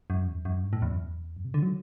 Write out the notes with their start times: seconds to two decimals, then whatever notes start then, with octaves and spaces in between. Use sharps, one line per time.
0.10 F#2
0.27 E2
0.45 F#2
0.63 G2
0.73 A2
0.82 E2
0.90 F#2
1.00 E2
1.36 F#2
1.45 C3
1.54 D3
1.63 F#3